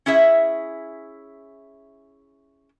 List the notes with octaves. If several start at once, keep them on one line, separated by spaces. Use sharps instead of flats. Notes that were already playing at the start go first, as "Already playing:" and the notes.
C#4 E4 G#4 E5